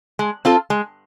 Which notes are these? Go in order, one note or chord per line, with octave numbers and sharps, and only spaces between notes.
G#3
C4 F4 A4
G#3